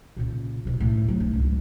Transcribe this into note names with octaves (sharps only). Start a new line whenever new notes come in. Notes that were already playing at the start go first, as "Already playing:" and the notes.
A#2 C#3
D1 B2
A2 D#3
D#2 F#3
G#2 D4
C#2